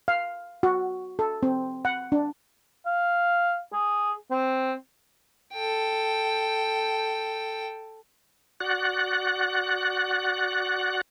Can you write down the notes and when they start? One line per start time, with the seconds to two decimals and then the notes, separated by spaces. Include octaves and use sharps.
0.08 F5
0.63 F#4
1.19 A4
1.43 C4
1.85 F#5
2.12 D4
2.86 F5
3.73 G#4
4.31 C4
5.53 A4 G5
8.60 F#4 D5 F#5 F#6